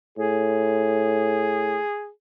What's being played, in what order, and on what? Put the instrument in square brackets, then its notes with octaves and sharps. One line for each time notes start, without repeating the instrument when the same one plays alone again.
[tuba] A2 [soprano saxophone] G#4